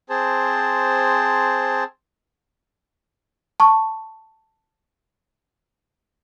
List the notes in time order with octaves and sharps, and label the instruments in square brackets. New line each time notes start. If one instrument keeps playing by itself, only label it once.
[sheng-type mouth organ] C4 G#4 C5 A5
[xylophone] A5 C#6